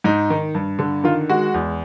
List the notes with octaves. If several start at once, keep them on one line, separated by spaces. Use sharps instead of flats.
G#2 D#4
D#3
G2
D3
D#3 F4
G#3 F#4
E2